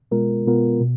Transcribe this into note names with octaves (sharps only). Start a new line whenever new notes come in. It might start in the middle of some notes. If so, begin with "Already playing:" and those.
B2 G#3 B3 F4 A#4
B2 G#3 B3 F4 A#4
B2